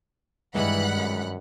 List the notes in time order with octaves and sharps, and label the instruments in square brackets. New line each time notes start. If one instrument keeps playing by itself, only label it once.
[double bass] G2 D#3 [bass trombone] E3 [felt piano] G#3 [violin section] F#5 B5 F#6
[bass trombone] F#2